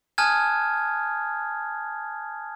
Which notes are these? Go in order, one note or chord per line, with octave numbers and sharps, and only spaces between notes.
G#5 A5 D#6 F6 F#6 G#6